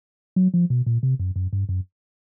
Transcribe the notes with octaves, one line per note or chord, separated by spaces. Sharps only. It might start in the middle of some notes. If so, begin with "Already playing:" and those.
F#3
F3
B2
A#2
C3
F#2
F#2
G2
F#2